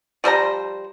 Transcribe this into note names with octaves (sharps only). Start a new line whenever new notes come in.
F3 G3 C5 A#5